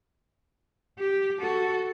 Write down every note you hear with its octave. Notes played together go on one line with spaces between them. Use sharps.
G4
F#4 A4